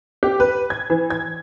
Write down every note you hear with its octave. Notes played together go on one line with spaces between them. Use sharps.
G4
B4
G#6
E3
G#6